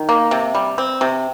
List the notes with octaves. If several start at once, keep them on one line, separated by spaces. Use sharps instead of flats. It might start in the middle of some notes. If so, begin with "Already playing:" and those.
Already playing: D#3
A#3
C3
G3
C4
C3